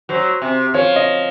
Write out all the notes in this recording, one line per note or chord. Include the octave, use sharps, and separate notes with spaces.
F#3 C5
C3
F3 C#5
D#5